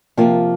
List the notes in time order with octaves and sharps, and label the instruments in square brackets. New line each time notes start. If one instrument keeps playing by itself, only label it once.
[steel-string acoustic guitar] C3 F3 A#3 F4